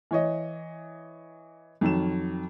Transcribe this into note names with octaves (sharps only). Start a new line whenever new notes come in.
E3 C#5 D#5
F2 D#3 F#3 E7